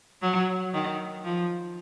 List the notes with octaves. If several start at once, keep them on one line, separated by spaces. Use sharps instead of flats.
F#3
D#3
F3